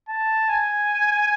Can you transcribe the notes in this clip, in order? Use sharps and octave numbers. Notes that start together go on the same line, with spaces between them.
A5
G#5